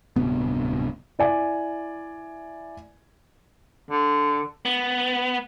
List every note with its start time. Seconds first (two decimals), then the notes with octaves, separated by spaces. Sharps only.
0.16 D1 G2 C3 B3
1.19 E4 D5 G#5
3.91 D3
4.65 B3